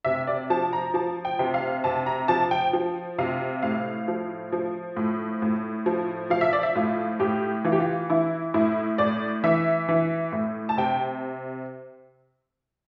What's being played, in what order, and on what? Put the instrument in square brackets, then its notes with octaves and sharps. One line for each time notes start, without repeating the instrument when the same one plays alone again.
[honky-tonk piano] C3 E5
D5
F3 A5
A#5
F3 A5
G5
C3
F5
C3 A5
A#5
F3 A5
G5
F3
C3 F5
A2 F5
F3
F3
A2
A2
F3
F3 F5
E5
D5
E5
A2 F4
A2 G4
E3 F4
G4
F4
E3 E4
A2 E4
A2 D5
E3 E5
E3
A2
A5
C3 G5